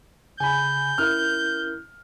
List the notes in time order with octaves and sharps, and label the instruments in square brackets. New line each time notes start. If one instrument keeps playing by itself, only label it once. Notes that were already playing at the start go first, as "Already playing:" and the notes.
[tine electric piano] C#3 B5 [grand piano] G#5 [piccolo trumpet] G6
[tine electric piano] C#4 E4 A#4 [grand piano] F6